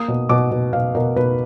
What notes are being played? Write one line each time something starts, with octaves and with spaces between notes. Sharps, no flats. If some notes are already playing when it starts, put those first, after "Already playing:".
Already playing: A#3 D#6
B2
B2 D6
B2
B2 F5
B2 A#4
B2 B4